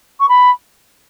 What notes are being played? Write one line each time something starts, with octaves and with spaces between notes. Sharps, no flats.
C#6
B5